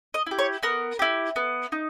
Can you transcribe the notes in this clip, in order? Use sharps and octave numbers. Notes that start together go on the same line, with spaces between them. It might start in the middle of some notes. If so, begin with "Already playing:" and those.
D#5
E4 G4
C#5
B3 A#4
E4 G4
B3
D#4